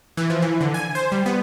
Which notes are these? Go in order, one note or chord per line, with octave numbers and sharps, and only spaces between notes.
E3
F3
E3
D3
G#5
C5
G3
B3